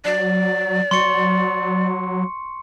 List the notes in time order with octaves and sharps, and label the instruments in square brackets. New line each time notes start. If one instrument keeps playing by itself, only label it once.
[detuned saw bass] F#3 [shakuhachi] D5
[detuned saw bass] F#3 [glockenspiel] C6 C#6 C#7